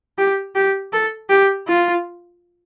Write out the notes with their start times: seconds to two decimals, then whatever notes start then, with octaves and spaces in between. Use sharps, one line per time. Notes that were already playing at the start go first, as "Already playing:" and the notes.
0.18 G4
0.55 G4
0.93 A4
1.30 G4
1.68 F4